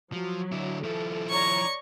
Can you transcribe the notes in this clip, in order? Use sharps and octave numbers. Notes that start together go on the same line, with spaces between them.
F3 F#3
D3 E4
F3 E4 A4
C#5 D5 A#5 C#6